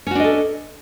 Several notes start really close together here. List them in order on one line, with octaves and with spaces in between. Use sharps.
C#4 F#4 D4 D#5 A4